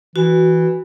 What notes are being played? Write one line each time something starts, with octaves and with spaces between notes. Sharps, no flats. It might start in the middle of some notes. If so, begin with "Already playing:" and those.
E3 F#4